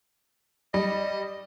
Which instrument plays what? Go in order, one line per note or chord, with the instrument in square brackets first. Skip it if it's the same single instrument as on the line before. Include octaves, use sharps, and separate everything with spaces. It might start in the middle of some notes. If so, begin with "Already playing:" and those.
[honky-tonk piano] G3 [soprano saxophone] D#5